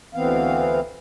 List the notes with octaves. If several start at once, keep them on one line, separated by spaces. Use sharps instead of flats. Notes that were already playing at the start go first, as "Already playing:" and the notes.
D2 E3 B3 C4 F5